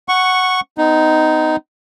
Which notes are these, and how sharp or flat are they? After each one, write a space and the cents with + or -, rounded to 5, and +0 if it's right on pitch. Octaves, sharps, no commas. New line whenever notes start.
F#5 +0 C#6 -5
B3 +40 D#4 +0